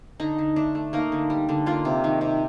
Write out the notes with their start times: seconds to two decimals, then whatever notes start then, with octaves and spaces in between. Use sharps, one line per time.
0.20 D3 D#4
0.38 D3
0.56 A3 D4
0.75 A3
0.93 A#3 D#4
1.12 D3
1.30 G3
1.49 D3
1.66 A#3 F4
1.85 C3
2.04 D#3
2.21 C3